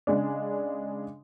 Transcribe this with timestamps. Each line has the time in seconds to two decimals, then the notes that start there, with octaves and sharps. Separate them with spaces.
0.07 C#3 G#3 D4